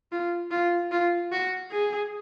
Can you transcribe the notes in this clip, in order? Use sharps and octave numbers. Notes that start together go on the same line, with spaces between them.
F4
F4
F4
F#4
G#4